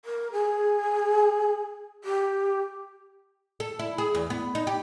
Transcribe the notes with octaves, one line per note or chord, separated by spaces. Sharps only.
A#4
G#4
G4
A4
E4
G#4
E2
B3
D#4
G4